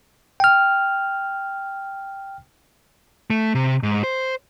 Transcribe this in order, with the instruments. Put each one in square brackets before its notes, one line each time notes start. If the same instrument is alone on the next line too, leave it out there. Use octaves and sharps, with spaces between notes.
[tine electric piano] G5 F6
[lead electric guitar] A3
C3
G#2
C5